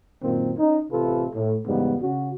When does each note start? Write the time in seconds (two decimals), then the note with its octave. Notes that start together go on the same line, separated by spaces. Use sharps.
0.22 F#2 A#2 D#3 A#3 C4
0.58 C#4 D#4
0.91 A1 C3 F4 A4 B4
1.35 A2
1.67 E2 G#2 C#3 G3 B3
2.00 C#3 C#4 F#4